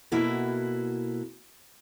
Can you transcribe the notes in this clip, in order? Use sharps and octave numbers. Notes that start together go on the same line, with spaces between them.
B2 A#3 E4 F#4 A4